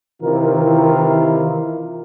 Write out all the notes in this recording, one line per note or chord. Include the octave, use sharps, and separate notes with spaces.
C3 D#3 E3 E4 F4 A#4